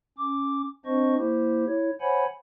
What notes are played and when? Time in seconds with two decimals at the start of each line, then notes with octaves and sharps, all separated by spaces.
0.18 C#4 D6
0.85 C4 D4 C5 D#5 C#6
1.18 A#3 E4 G4 C5
1.67 E4 C#5
2.00 C5 C#5 F#5 G#5 B5